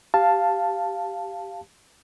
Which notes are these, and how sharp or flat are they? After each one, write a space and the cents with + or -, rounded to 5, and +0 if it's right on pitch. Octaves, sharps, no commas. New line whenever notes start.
G4 +0 F5 +0 A5 +0